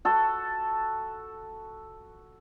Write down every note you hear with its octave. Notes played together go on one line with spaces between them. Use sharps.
F#4 A4